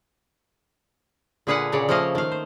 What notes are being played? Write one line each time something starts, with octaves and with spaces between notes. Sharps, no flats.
A#2 D3 G#4 B4 F5 F#5
A#2 C#3 C#5 D5
F3 A3 A#3 D#5 F5
D#3 F5
C5